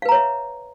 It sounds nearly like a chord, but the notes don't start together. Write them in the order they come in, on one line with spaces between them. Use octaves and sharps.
F5 B4 A#5 C#5 E5